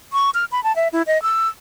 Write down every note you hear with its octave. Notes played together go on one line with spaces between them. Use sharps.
C#6
F6
B5
A5
E5
E4
D#5
E6